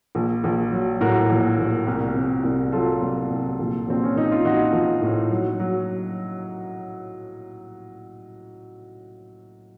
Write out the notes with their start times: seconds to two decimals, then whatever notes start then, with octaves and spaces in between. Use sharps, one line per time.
0.15 A#1
0.44 A#1
0.72 F#3
1.01 A2 F#4 A#4
1.30 A#1
1.58 A#1
1.87 C2
2.15 C3
2.44 C2
2.72 F#3 F4 A4
3.01 C2
3.30 C2
3.59 A#1
3.88 A#1 C4
4.04 C#4
4.16 A#1 D#4
4.31 F4
4.44 A#1 D#4 F#4
4.73 F3
5.02 A2
5.31 F#3
5.60 F#3